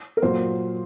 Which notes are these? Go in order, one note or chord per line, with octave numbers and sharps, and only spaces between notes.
A#4
A#2 F#3 C5